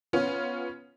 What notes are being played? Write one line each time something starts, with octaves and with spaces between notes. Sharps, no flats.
B3 C#4 F4